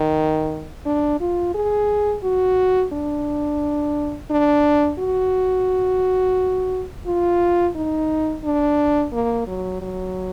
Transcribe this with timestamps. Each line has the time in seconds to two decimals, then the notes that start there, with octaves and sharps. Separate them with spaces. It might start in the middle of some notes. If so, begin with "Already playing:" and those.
Already playing: D#3
0.86 D4
1.20 F4
1.55 G#4
2.24 F#4
2.93 D4
4.31 D4
4.99 F#4
7.07 F4
7.76 D#4
8.44 D4
9.13 A#3
9.47 F#3
9.82 F#3